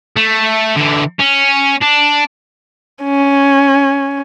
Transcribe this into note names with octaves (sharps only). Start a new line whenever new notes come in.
A3
D3 E3
C#4
D4
C#4